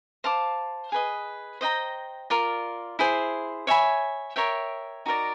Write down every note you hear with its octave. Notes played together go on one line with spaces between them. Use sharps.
C5 F5 A5 D6
G#4 B4 D#5
C5 D#5 G5 A#5
F4 A#4 D5
E4 G#4 C5
C#5 E5 G#5 B5
A#4 C#5 E5 G5
D#4 F#4 A#4 D5